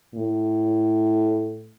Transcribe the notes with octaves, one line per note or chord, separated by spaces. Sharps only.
A2